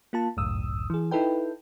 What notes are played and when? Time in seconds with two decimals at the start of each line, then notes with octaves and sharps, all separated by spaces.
0.13 A#3 F4 A5
0.37 G1 C#2 F#2 A2 D#6 E6
0.90 E3 G#4
1.11 D#4 E4 A4 B4 G5